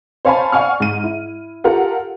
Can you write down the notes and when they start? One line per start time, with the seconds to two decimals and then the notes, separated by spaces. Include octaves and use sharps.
0.25 C5 C#5 F5 G#5 A5 B5
0.52 D5 F5 F#5 G#5 C#6 F6
0.80 G#2 D#7
1.04 E4
1.64 F4 G4 A4 A#4 F#5